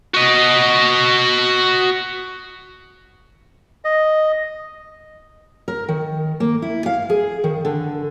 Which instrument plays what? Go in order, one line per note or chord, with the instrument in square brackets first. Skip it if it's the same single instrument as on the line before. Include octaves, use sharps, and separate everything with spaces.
[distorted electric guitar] F#4 D#5
[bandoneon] D#5
[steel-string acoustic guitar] A#4
D#3
A#3
E4
F5
G#4
D#3
D3